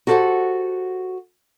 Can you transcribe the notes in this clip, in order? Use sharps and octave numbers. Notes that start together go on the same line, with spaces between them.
F#4 G4 A4 B4 C5 F#5